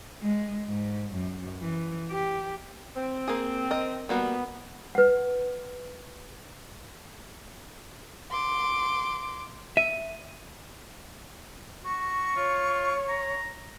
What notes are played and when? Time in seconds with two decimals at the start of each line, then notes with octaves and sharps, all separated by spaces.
0.22 G#3
0.69 G#2
1.14 F#2
1.61 E3
2.11 G4
2.96 C4
3.28 A#3 G#4
3.71 A#4 D#5
4.09 G3 A#3 B3 F#4
4.95 B4 F#5
8.31 C6 D6
9.77 E5 D#7
11.84 F#4 C#6
12.36 F4 C#5
13.08 A#5